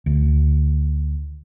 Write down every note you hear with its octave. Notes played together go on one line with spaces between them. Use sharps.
D2